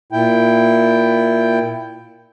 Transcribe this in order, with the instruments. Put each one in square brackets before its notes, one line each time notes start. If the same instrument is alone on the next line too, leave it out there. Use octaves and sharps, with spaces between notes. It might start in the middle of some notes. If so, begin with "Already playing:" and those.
[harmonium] A#2 E4 G5